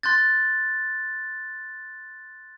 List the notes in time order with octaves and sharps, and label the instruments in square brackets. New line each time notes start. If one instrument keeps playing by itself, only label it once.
[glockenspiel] C6 F#6 G6 A6